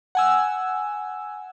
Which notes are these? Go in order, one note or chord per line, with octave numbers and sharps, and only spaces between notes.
F#5 G#5 E6